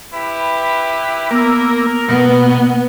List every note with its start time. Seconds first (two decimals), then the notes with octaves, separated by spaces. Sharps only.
0.13 E4 G4 B4
1.31 A#3 B3 A#4 E6
2.09 B2 A#3 B3 B4